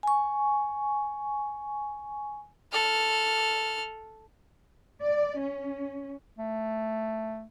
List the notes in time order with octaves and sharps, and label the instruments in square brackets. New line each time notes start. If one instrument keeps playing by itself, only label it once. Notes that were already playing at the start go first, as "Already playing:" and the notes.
[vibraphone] G#5 C#6
[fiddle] A4 F6
[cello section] D5
C#4
[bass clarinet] A3